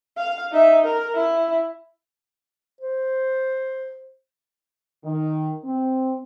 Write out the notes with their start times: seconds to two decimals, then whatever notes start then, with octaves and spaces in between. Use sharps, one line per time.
0.17 F5
0.51 D#4 E5
0.85 A#4
1.15 E4
2.81 C5
5.04 D#3
5.64 C4